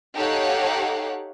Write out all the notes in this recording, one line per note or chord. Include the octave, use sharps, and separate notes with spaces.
D#4 G4 A4 C#5 F5 F#5